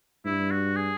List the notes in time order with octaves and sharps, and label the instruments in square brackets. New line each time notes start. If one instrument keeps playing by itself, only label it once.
[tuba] G2 [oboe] E4
[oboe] F#4
G#4